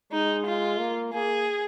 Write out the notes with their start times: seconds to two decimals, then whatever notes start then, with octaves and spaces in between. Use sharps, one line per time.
0.12 G#3 D#4
0.46 F4
0.80 A#3
1.13 A#3 G#4